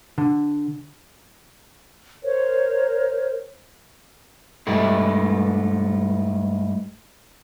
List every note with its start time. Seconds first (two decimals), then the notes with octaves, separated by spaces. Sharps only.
0.18 D3
2.23 A#4 C5 C#5
4.67 G2 G#3 A3 E4